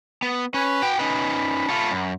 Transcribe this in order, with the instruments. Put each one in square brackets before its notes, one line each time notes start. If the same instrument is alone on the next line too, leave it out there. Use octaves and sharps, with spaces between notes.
[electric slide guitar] B3
[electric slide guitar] C#4 [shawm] B4
[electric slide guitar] F#4 G5
[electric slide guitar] C#4 D#4 B4 [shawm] B5
[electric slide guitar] A3 F4
F#2